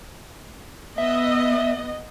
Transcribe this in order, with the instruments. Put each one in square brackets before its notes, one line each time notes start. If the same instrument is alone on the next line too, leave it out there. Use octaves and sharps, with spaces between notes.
[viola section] B3 D#5 [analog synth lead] E5